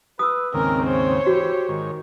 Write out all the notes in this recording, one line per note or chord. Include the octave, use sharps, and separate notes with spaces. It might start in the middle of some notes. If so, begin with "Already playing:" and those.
B4 D#6 E6
D#2 G#2 C#3 C4 A#4
C5 C#5
E3 F#4 G4
G#2 D#3 C#5